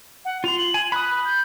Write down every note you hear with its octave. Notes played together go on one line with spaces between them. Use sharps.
F#5
F4 C6 F7
F#7
G#5
B5 D#6 F#6
G6